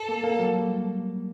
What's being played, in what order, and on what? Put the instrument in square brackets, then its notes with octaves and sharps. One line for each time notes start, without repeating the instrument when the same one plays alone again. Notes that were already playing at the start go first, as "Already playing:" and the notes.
Already playing: [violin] A4
[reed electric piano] A#3
A#3
F#3
G3